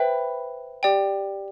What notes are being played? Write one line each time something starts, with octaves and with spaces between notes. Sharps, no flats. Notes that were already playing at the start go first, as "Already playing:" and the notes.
Already playing: B4 C5 E5 G5 B5
G4 D5 G5